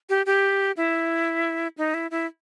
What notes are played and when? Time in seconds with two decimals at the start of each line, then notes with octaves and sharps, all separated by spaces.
0.09 G4
0.26 G4
0.77 E4
1.78 D#4
1.94 E4
2.11 E4